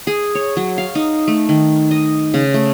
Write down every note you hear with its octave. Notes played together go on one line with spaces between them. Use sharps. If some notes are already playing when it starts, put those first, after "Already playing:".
G#4
C#5
F#3
F5
D#4
A3
D#3
D#5
C#3
A3